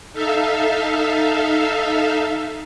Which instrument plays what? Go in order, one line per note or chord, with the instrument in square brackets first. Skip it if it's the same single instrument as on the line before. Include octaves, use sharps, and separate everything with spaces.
[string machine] D#4 A4 E5 F5